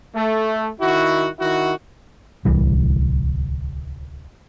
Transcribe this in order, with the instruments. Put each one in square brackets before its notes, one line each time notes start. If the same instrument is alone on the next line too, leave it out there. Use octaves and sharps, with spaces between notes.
[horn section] A3
D#3 E4 F#4
D#3 E4 F#4
[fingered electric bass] D1 C2 E3 G3